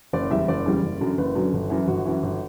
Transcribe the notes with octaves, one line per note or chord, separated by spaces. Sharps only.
F#1 D5
E2 C#3 G3 E5
F#1 D5
E2 C#3 G3
F#1
F#2 D3 F#3
F#1 B4
F#2 D3 F#3
G1
F#2 E3
G1 F#4
F#2 E3
G1